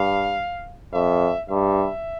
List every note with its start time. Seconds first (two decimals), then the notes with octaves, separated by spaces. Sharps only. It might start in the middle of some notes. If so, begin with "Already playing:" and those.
Already playing: G2 F5
0.93 F2 E5
1.49 G2 E5